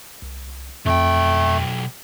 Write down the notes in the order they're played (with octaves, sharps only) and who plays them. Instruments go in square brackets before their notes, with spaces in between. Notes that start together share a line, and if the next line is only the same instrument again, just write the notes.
[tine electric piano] C2
[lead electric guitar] B1 G5 [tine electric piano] F2 [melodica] A3